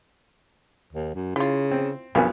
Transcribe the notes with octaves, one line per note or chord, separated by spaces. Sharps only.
D#2
F#2
C#3 E4 F4
C4
B1 G2 F3 A#3 B3 F5 G#5